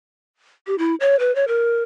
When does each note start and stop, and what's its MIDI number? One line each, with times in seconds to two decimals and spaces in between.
0.67 0.75 67
0.78 0.95 64
1.00 1.16 73
1.20 1.34 71
1.35 1.45 73
1.48 1.83 70